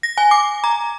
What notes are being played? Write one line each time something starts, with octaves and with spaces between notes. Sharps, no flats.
A#6
G#5
D6
A#5